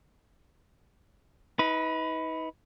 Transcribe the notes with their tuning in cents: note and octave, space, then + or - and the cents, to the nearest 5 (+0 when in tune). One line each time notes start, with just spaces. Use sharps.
D#4 +40 B4 +0